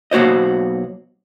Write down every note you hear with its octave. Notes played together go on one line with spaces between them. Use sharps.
B1 A#3 F#4 C5 D#5